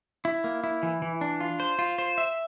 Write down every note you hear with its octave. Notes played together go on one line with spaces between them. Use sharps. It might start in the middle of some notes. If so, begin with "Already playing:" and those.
E4
A#3
E4
E3
E3
D4
F4
C5
F4
C5
E5